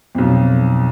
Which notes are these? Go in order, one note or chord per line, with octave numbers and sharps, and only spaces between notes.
B1 F2